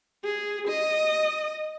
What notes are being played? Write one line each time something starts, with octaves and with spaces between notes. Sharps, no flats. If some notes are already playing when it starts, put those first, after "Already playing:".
G#4
D#5